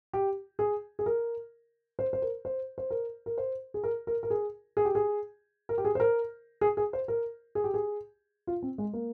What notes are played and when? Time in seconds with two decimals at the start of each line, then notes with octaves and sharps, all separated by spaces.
0.13 G4
0.59 G#4
0.99 G#4
1.06 A#4
1.99 C5
2.13 C5
2.22 A#4
2.45 C5
2.78 C5
2.90 A#4
3.26 A#4
3.38 C5
3.74 G#4
3.84 A#4
4.07 A#4
4.23 A#4
4.30 G#4
4.77 G#4
4.85 G4
4.95 G#4
5.69 A#4
5.78 G4
5.85 G#4
5.95 C5
6.00 A#4
6.61 G#4
6.77 G#4
6.93 C5
7.08 A#4
7.55 G#4
7.64 G4
7.74 G#4
8.47 F4
8.62 C4
8.78 G#3
8.93 A#3